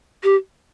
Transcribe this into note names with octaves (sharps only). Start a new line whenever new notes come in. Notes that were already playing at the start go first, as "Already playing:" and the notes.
G4